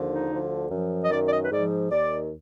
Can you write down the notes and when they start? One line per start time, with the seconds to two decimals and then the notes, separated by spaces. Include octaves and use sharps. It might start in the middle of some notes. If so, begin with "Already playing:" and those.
Already playing: D#2 D3 F3
0.09 D#4
0.29 D2 D3 F3
0.70 F#2 F3
1.02 D#5
1.10 D#3 D5
1.13 F#2
1.25 D5
1.31 D#5
1.43 B4
1.51 G#2 F3 D5
1.91 D#2 D#3 D5